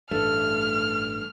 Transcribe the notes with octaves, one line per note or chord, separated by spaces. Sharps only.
A1 G2 A3 F6